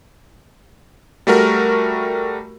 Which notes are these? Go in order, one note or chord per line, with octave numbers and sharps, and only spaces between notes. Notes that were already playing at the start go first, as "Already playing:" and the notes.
G3 A3 F#4 A#4